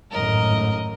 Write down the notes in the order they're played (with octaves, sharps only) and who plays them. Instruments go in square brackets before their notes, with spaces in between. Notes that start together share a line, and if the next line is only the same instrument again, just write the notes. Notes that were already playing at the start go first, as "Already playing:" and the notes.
[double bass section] G#1 F#2 A2 [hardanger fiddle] A#4 D#5